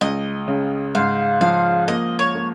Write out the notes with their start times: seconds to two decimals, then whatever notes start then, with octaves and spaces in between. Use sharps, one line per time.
0.01 C#2 D#5
0.48 C#3
0.95 G#2 F5
1.41 F3 F5
1.87 A#3 D#5
2.19 C#5
2.35 A#3